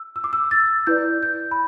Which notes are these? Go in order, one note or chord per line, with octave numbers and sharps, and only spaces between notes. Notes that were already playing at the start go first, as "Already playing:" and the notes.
Already playing: E6
E6
D6
E6
A6
E4 B4 D5 G6
G6
B5